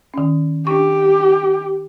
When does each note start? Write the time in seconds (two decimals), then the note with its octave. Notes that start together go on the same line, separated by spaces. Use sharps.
0.14 D#3 C#4
0.67 D4 G4 C#6